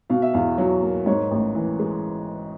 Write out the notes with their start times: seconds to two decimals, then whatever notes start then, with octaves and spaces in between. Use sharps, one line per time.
0.10 B2 F5
0.22 E5
0.34 E2 F5
0.58 F#3
0.82 A#3
1.06 G#2 C#5
1.31 A1
1.55 E3
1.79 G#3